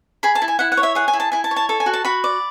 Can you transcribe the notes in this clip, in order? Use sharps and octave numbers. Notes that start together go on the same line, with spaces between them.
G#4 B5
A5
E4
G#5
E4 F#5
F#5
C#5
E5
G#4 F#5
G#5
E4
A5
E4 G#5
A5
C#5
A5
A4 A5
G#5
F#4
A5
F#4 B5
D5